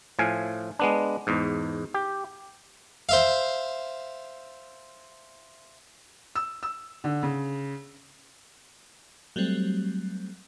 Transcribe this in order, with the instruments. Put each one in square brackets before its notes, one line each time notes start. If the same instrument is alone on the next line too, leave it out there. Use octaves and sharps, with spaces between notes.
[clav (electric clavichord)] A2 F3 F5 G#5
G#3 B3 D4
E2 G#2
G4
[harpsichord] C5 E5 F5
[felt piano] E6
E6
D3
C#3
[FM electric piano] F#3 G3 A3 C4